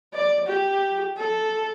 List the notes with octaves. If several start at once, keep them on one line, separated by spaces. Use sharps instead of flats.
D5
G4
A4